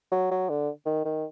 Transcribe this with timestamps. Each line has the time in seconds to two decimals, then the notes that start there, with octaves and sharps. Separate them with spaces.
0.11 F#3
0.31 F#3
0.49 D3
0.86 D#3
1.05 D#3